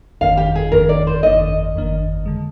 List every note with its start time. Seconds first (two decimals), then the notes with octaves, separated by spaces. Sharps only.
0.21 G1 F2 D#3 A#3 D4 F5
0.37 G4
0.55 G#4
0.72 G1 F2 D#3 A#3 D4 A#4
0.89 D5
1.07 C5
1.23 G1 F2 D#3 A#3 D4 D#5
1.75 G1 F2 D#3 A#3 D4
2.26 D3 G#3